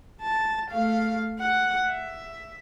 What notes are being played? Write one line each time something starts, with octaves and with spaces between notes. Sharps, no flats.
A5
A3 F5
F#5
E5